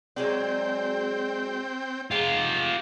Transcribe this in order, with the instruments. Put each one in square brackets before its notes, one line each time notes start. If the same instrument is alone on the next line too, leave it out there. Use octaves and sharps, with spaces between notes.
[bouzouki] F#3 G#3 D5 [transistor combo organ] C4 G5
[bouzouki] G#3 D#4 [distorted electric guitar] F4 G4